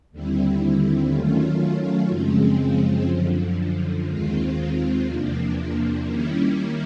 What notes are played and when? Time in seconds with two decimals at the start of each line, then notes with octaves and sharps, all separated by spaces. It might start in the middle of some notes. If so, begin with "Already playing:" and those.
0.12 D#2 D3 G3 C4 E4
1.10 D#3 F#3 A3 C#4 F4
2.09 F#2 C#3 F3 G#3 C4
3.08 F#2 D3 F3
4.07 D#2 D#3 G#3 C4 F4
5.05 E2 C3 F3 A#3 D4
6.04 D#3 G3 A#3 C#4 E4